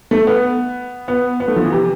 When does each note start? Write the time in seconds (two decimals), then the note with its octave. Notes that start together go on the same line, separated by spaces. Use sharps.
0.11 A3
0.27 B3
1.08 B3
1.40 B3
1.48 A3
1.56 F3
1.64 E3
1.72 C3